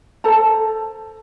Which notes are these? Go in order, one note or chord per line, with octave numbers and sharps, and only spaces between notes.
A4 C5 A5 A#5